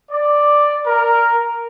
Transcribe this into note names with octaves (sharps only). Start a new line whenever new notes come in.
D5
A#4